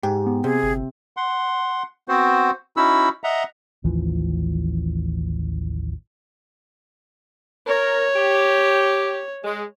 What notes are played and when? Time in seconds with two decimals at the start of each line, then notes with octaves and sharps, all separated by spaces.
0.03 G#2 G4
0.26 B3
0.44 C3 G#4
0.63 G1
1.17 F#5 C6
2.08 B3 C4 F#4 C5
2.77 C#4 D#4 E4 F#4 B5 E6
3.24 D#5 E5 F#5 A#5
3.84 A1 D#2 E3 F3
7.67 A#4 C#5
8.15 G4
9.44 G#3